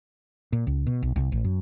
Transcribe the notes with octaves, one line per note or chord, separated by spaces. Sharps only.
A#2
C#2
B2
B1
C2
A1
F#2